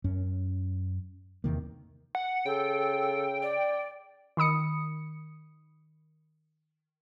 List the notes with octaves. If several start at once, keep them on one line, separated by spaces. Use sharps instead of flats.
F#2 C#4
E2 C3 D#3 A#3
F#5
C#3 A4 G5
D5
D#3 B5 D#6 C#7